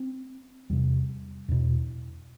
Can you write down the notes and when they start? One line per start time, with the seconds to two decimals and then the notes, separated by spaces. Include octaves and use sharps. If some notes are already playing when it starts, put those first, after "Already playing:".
Already playing: C4
0.70 E2 C3 G3
1.48 E2 B2